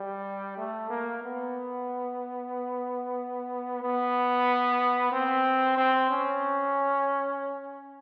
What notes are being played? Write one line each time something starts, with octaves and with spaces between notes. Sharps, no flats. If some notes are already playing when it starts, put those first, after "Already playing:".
Already playing: G3
A3
A#3
B3
B3
C4
C4
C#4